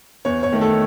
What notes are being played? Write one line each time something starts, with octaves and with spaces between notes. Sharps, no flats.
E2 C#5
C#5
D#3 A3
A4